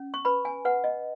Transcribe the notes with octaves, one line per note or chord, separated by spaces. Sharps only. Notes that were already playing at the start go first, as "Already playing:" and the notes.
Already playing: C#4
C#6
B4 B5
G#5
B4 F#5
D#5